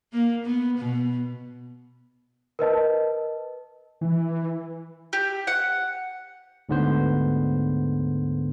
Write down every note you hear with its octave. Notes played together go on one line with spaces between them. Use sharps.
A#3
B3
B2
A#4 B4 D#5 A5
E3
G4
F#5
D2 G#2 D3 B3 C5